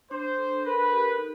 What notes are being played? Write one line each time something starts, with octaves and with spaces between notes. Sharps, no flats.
D4 C5
A4
A#4 B4
G4
D#4